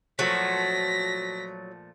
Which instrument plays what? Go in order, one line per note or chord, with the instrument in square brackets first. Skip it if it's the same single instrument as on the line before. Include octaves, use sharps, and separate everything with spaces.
[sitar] A#2 F3 A3 [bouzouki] F#3 [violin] A#6 B6